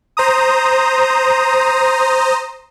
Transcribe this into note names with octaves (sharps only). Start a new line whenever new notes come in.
C5 A#5 D#6